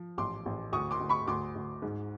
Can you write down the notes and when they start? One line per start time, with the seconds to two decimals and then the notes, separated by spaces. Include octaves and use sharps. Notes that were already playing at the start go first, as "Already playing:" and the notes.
Already playing: F3
0.18 A1 C6 D6
0.46 A1
0.73 D2 C#6 D#6
0.91 C6 D6
1.00 D2
1.09 B5 C#6
1.27 D2 C6 D6
1.55 D2
1.82 G#2